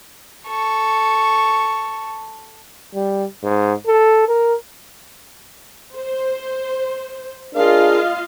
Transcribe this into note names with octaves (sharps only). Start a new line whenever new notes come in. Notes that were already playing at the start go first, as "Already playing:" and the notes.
A4 C#6
G3
G#2
A4
A#4
C5
D4 F4 G#4 A#4 D#5 F5